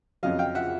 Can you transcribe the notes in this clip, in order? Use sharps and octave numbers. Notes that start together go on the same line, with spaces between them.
F2 C#3 F#3 D#5 F5
F5 G5
E5 F#5